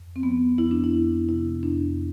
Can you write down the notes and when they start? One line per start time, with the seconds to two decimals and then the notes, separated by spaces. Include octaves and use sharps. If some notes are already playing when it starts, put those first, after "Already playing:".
Already playing: F2
0.16 C4
0.23 F3 B3
0.58 F2 E4
0.71 D4
0.84 E4
0.93 F2
1.28 C3 E4
1.63 F2 D4